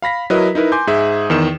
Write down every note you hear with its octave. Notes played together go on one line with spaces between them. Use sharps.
F5 B5 A#6 B6
F#3 E4 A#4 B4 D#5
D#4 E4 A#4 B4
G#5 C6 D6 G6
G#2 G#4 E5
E2 D#3 E7